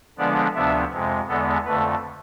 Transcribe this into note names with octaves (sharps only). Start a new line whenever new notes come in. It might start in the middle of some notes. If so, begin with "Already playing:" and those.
D3 F3 G#3 B3 D4 D5
D2 C3 F3 B3 D4 E5
F2 C3 G#3
E2 D3 G#3 B3 A4
F2 D3 A3 B4